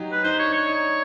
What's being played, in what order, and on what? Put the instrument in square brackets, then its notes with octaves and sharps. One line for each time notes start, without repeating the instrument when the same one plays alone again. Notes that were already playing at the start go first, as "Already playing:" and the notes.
Already playing: [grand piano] F#3 D#4 F#4 G4
[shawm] B4
[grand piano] D#4 [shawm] C5
[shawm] C#5
[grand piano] D4
[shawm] C#5
[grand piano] D#4